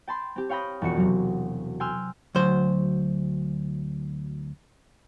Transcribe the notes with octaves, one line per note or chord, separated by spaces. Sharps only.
G5 A5 B5 C6
C4 G4
C#5 F5 G5 B5 D#6 A#6
E1 F2 F#4 C#7
C3 F#3
G5 G#5 C6 E6 F6
D2 F#3 C5